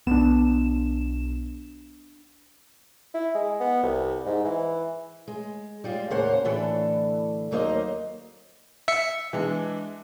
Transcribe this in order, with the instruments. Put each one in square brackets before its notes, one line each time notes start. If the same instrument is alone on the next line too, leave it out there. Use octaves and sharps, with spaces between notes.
[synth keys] B1 E7 [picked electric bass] B3 D4
[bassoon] E4
G#3
B3
C2
G#2
E3
[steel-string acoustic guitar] G#3
G3 G#3 F4
D#2 A2 C#3 A#3 C5 F#5
A2 D3 E3 D4 A4
D#2 F#3 A#3 D#4 C5 D#5
[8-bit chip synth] E5 C#7
[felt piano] E3 G#3 D4